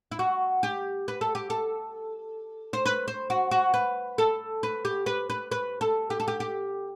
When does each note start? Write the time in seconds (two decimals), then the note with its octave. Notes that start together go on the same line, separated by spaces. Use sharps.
0.12 E4
0.19 F#4
0.63 G4
1.08 B4
1.21 A4
1.35 G4
1.50 A4
2.73 C5
2.86 B4
3.08 C5
3.30 F#4
3.51 F#4
3.74 B4
4.18 A4
4.63 B4
4.85 G4
5.06 B4
5.30 B4
5.51 B4
5.81 A4
6.10 G4
6.20 A4
6.28 G4
6.40 G4